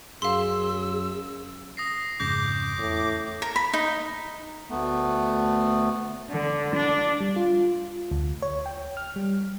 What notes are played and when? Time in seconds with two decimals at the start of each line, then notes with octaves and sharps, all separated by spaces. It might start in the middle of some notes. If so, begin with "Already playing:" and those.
0.22 F#2 G#4 F5 C6 E6
1.77 D#6 A#6 C7
2.20 F2 G#2 C#3 D6 G6 A#6
2.79 E2 A2
3.42 A#4
3.56 B5
3.73 D#4
4.70 D2 A3 B3
6.30 D3
6.75 D4
7.21 G3
7.36 F4
8.11 D2
8.42 C#5
8.66 G5
8.97 F6
9.16 G3